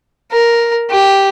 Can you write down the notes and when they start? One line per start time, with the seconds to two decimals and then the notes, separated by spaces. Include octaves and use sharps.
0.32 A#4
0.91 G4